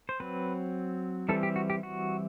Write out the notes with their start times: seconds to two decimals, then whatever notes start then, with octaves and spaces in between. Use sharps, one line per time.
0.09 C5
0.20 F#3 C4 B4
1.29 E3 G3 C4 A4
1.43 G4
1.56 F#4
1.70 G4
1.83 F#4